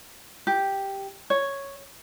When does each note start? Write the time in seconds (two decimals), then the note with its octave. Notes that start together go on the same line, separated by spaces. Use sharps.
0.47 G4
1.30 C#5